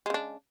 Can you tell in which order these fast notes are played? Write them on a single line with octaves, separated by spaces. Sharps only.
G#3 C#3 D4